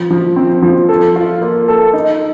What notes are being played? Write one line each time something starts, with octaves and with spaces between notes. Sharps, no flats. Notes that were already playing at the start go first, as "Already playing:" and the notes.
Already playing: F3
F3
C4
F3
A4
F4
A#3
A4
D#4